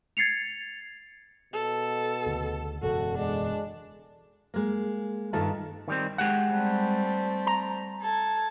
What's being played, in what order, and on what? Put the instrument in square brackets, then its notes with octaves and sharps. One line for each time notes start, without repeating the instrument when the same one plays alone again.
[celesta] G#6 A6 C7 C#7 F7
[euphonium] B2 [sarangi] A4
[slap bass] D2 C#3
[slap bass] E1 F#2 C#3 [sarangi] F#4 [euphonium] A4
[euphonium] G#3 [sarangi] D4
[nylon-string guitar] G#3 A#3
G2 D#3 A3 F4 A4 A5
[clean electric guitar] D#3 G3 C4
G#3 G4 F#5
[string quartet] G3 A3 C4
[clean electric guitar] A#5
[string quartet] A4 G#6